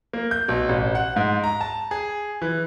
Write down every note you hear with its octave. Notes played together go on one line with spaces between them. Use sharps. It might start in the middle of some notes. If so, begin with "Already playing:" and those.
A#3
G6
B1
A1
F#5
G#2
A#5
A5
G#4
E3